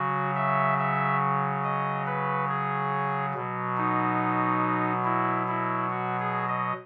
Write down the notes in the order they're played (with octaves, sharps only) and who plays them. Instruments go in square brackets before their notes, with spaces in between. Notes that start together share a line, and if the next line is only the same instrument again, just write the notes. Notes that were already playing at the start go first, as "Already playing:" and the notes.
Already playing: [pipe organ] C#3 F#3 F#4
E5
E5
D#5
B4
G#4
B2 F#3
D#4
E4
E4
F#4
G#4
D#5